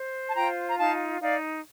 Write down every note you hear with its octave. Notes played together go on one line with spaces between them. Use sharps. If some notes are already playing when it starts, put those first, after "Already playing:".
Already playing: C5
A5
F4 G5 A#5
A#5
D#4 F5 A5
D#4 D5 F5